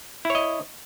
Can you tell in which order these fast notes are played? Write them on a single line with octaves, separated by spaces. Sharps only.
E4 C#5 D#5